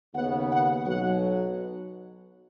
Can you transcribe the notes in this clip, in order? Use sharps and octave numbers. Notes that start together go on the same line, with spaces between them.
D#2 C#3 B3 F#5
F#5
B1 B2 F#3 F#5